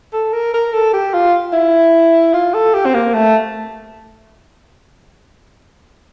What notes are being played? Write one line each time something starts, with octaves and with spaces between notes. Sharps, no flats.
A4
A#4
A#4
A4
G4
F4
E4
F4
A4
G4
C4
A#3
A3